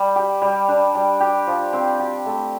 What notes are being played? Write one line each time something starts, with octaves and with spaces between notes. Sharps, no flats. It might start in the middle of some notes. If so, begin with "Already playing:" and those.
Already playing: G3
G4
G3
D4
G3
G4
F3
C4
G4
A3